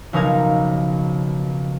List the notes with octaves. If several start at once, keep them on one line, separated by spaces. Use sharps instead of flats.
B1 C#3 F3 D#4 A#4 G#6